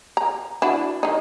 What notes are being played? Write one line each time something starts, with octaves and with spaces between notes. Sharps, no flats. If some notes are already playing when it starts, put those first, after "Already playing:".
A#5
D4 E4 F#4
D#3 D#4